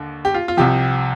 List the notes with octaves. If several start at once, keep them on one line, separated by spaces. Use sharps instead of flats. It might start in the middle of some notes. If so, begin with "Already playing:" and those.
Already playing: D#2 D3
G4
F4
F4
C2 C3 F3 G4